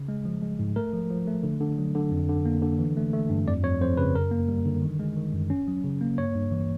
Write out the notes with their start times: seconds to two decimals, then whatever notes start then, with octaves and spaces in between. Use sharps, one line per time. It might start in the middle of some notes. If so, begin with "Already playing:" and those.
Already playing: C#3
0.08 G#3
0.25 F3
0.42 G#3
0.59 G#2
0.76 A3 A#4
0.93 F3
1.10 F3
1.27 A3
1.43 D3
1.61 D3
1.78 F#3
1.95 D3
2.11 F2
2.29 D3
2.45 A#3
2.62 D3
2.79 E3
2.97 A3
3.13 A3
3.30 G2
3.47 F2 D5
3.64 F2 C#5
3.80 F2 C5
3.97 C#3 B4
4.15 F#2 A#4
4.31 A#3
4.48 G3
4.66 D3
4.82 D#3
4.99 G#3
5.17 D#3
5.33 F#2
5.50 C#4
5.68 F#3
5.84 C#3
6.01 A#3
6.18 G2 C#5
6.35 G2
6.52 E3